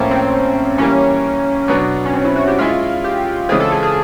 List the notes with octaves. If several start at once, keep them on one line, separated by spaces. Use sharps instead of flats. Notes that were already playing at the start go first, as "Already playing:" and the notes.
Already playing: A2 F3 A#3 C#4
C4
E3 G3 A#3 C#4
B2 F#3 B3 D4
C#4
C4
E4
F#4
G4
G#3 C#4 E4 F4 G#4
G4
C#3 E3 G#3 C4 F4 G#4
A4
G#4
G#4